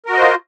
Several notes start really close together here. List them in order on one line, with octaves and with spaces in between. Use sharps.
A#4 F#4 D#5 C5 F4